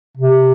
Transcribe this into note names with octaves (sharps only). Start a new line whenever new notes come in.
C3